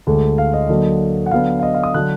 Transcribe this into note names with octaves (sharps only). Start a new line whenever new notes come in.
D2 D3 G#3
F5
D#5
D3 F#3 A#3 D4
F#5
D3 F#3 B3 D4 F5
F5
D#5
F5
D#6
D3 F#3 D4 F#6